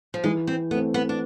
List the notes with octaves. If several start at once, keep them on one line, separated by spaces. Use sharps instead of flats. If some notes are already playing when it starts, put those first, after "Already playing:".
F3
E3 G#3
C4
A3 B3 C4
B3
D4